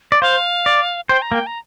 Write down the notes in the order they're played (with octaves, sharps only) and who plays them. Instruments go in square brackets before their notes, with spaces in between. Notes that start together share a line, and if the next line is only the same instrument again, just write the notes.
[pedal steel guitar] D5
[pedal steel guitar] C5 [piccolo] F5
[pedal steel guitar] D5
[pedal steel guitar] C5 [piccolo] G5
[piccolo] A#5
[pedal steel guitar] A#3
[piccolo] G5
A#5